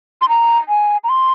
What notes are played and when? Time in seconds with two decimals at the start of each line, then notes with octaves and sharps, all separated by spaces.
0.21 C6
0.29 A#5
0.69 G#5
1.04 A#5
1.09 C6